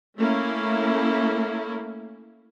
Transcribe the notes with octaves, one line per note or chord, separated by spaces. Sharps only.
A3 A#3 C#4 E4